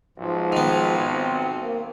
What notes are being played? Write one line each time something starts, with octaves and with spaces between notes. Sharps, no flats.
B1 G#2 F3
D#3 B3
C4
A#3